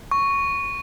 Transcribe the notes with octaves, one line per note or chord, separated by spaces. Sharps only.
C#6